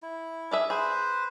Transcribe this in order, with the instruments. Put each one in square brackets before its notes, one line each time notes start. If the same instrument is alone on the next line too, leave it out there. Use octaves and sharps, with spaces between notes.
[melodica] E4
[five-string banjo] D4 G#4 E5
[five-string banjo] G#4 [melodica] B4 C5